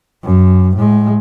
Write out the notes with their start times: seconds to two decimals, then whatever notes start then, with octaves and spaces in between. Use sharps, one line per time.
0.24 F#2
0.77 A2 G#3